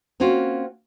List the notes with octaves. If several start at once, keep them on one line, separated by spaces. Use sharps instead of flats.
A#3 C4 C#4 F4 F#4